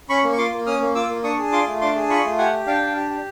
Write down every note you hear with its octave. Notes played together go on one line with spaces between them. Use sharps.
C#4 B5 C#6
A#3
C#6
F4 C6 D6
A#3
C#4 D#6 F6
A#3
F4 D6 E6
A#3
D4 C#6 D#6
G#4
F4 C6 D6
A3
D4 C6 D6
G#4
F4 B5 C#6
A3
G4 F#5 G#5
G4
D4 F5 G5
D4
G4
G4